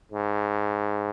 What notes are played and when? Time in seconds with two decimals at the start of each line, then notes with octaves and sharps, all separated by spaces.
0.12 G#2